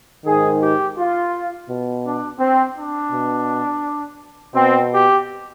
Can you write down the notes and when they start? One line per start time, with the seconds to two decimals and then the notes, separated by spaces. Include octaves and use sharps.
0.24 G#2 D#3 G#4
0.61 G4
0.97 F4
1.68 B2
2.04 D4
2.39 C4
2.76 D4
3.11 B2
4.55 B2 C4
4.91 G4